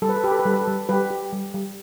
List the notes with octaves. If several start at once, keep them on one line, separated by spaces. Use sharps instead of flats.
G3 A4
B4
A4
G4 B4
A4
B4
G3 A4
B4
A4
G3
G3 G4 B4
G4
G3
G3